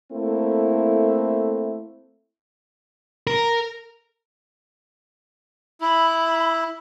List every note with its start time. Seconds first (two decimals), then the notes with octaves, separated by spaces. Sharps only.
0.12 A3 A#3 C4 E4 A4
3.27 A#4
5.81 E4 B5